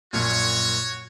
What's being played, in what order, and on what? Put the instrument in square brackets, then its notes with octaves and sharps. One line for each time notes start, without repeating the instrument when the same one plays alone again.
[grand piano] A#1 F#2 A#2 [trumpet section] F#4 C#5